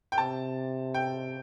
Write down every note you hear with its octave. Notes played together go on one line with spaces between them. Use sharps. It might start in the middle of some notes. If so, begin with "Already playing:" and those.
G5
C3 A5
G5